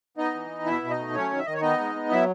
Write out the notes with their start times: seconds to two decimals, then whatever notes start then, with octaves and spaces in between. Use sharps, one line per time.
0.17 B3 D#4 D#5
0.34 E3
0.50 B3
0.66 B2 E4 E5
0.82 B2
0.90 D#4 D#5
0.99 A3
1.14 F#3 C#4 C#5
1.31 D#3
1.39 E5
1.46 D#3 D#5
1.54 C#5
1.61 B3 D#4 D#5
1.79 G#3
1.95 B3
2.11 F#3 E4 E5